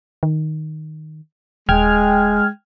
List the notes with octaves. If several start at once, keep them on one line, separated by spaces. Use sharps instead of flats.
D#3
D#1 G#3 G5 F6 G#6